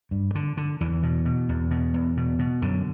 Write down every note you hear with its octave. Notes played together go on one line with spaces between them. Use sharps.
G2
D3
D3
E2 E3
B2
B2
E2
B2
E2
B2
B2
F#2 D3